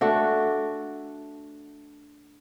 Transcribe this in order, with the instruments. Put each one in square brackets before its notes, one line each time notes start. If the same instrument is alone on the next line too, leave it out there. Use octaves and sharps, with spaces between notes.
[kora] A3 D4 F#4